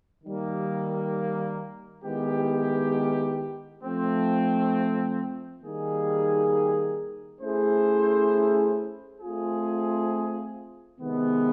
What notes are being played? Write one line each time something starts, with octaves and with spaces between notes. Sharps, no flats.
D#3 G3 A#3
D#3 G#3 B3 E4 G4
F3 A3 C4
D#3 G3 A#3 D#4 G#4
A3 C#4 E4 G#4 C5
A3 C4 F4 G#4
C3 D#3 G#3 B3